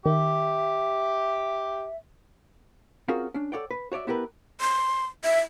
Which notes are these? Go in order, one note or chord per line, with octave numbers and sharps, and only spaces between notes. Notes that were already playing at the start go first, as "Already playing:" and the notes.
D#3 G4 E5 D6
C4 C#4 F4 F#4 G#4 A#4
C#4 D4
A4 A#4 C#5 D5 F#5 G5
B4
F#4 C#5 D5 E5
B3 E4 G4 A#4 B4
C6
E5